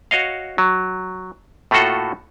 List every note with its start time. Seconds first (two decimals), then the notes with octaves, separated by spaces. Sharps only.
0.11 F#4 C#5 D#5 F5
0.58 F#3
1.71 A2 A3 A#3 F4 F#4 A4